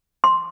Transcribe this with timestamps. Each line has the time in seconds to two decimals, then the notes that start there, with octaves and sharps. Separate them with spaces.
0.24 C6